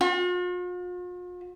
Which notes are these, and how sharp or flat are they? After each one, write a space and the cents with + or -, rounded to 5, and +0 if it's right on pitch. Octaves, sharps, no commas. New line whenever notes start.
F4 +45